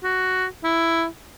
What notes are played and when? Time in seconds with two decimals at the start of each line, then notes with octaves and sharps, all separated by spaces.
0.04 F#4
0.64 E4